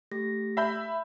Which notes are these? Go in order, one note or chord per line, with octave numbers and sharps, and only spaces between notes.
A3 G4 A#6
E5 B5 G6